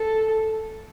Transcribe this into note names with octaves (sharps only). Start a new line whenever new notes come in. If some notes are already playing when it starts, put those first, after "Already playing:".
Already playing: A4